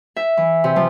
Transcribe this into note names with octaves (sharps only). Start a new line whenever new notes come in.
E5
E3
C3
F3